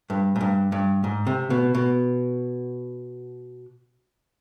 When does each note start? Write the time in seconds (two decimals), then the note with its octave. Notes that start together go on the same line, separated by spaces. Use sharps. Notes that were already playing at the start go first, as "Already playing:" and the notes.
0.10 G2
0.36 G#2
0.41 G2
0.72 G2
1.04 G#2
1.27 C3
1.50 B2
1.75 B2